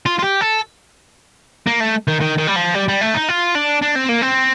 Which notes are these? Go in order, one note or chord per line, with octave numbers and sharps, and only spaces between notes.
F4
F4
G4
A4
A#3
A3
D#3
D#3
D#3
G3
F3
G3
G3
A3
D#4
F4
D4
D4
C4
A#3
C4